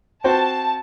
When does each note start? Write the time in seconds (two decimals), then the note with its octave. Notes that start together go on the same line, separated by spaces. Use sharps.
0.24 C4 F#4 C5 A5